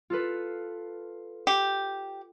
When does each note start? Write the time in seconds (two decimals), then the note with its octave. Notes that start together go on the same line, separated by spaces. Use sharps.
0.10 F4 A4 B4
1.47 G4